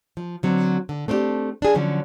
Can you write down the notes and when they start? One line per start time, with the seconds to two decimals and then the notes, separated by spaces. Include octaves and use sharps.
0.17 F3
0.43 D3 F#3 C4
0.89 D3
1.08 A3 C4 D4 E4 G4
1.62 D4 G#4
1.75 D3 F3 F#3 C#4